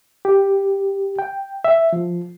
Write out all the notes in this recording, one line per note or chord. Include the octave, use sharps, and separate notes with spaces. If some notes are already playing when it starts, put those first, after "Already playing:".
G4
G5
E5
F3